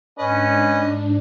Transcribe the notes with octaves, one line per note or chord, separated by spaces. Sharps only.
G#2 C#4 D4 B4 D#5